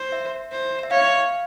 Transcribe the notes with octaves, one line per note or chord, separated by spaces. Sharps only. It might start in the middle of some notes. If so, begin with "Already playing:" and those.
Already playing: C5
E5
C5
E5
C#5 F5